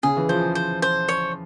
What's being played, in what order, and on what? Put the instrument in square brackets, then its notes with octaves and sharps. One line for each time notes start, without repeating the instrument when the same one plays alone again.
[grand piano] C#3 [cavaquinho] G#4
[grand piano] E3
[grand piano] F3 [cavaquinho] C5
[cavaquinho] C5
C5
C#5